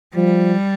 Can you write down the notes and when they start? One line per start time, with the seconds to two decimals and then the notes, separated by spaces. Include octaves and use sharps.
0.15 F3 G3